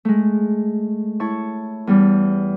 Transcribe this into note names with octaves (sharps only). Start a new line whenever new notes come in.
G#3 A3
E4 C#5 A5 C#6
E2 G3